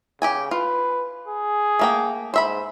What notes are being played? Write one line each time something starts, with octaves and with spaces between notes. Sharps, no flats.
C#3 G4 G5 G#5
F4 B4
G#4
A3 A#3 G5
G#2 C5 E5 B5